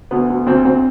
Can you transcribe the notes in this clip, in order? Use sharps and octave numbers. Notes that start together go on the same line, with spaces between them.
D2 B3
D2
D2 C4
D2 C4